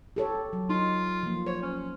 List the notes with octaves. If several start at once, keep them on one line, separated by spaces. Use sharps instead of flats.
G4 A4 C#5
F#3
D#4 F4
F3 A#3
C5 C#5
C#4